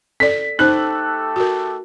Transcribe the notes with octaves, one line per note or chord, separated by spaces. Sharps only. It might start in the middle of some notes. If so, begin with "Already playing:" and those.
A4 D5 B6
A3 D#4 G4 A4 C5 F#6
F#4 A#4